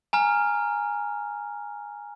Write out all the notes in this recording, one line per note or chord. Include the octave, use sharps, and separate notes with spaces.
G#5 A#5 F6